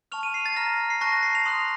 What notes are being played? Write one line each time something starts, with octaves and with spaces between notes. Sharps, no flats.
A5 C#6 F6 F7
D#7
C7
A6
A#5 F6 A#6
C7
A5 C#6 F#6 A#6
A#6
C7
F7
C6 D#6 F#6